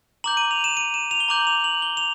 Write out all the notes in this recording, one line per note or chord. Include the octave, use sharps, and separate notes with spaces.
A#5 D6 G6 F#7
D#7
F7
E7
D#7
E7
F7
G7
A#5 D6 G6 F#7
F7
F#7
G7
F7